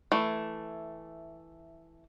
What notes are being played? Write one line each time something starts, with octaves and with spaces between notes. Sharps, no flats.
E3 A3